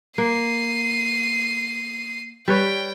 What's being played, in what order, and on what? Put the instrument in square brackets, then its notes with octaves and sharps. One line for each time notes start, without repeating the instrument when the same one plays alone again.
[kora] A#3 [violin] C7 D#7
[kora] G3 B4 C#5 [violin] G5